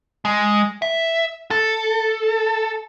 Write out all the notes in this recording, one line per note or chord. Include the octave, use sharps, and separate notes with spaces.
G#3
E5
A4